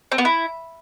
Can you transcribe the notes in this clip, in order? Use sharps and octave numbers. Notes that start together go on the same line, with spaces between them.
C4
B3
E4